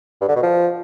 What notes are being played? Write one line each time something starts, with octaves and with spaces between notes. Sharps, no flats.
G2
D3
B2
F3